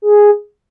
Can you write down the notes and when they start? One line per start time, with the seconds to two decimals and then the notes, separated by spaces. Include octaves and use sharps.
0.02 G#4